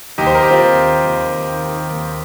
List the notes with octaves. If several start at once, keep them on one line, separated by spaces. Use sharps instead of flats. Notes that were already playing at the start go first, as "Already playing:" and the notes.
D#2 D#4 G4
C5
A#4
D#2 G4
C4 F4
D#2
D#3
D#2
D#2
D#3
D#3
D#2